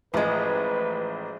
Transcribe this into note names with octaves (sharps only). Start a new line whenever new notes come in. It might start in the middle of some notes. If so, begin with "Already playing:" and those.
A1 F3 G#3 B4